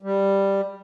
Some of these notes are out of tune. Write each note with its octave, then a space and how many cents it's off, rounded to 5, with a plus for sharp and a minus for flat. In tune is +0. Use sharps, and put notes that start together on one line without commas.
G3 +5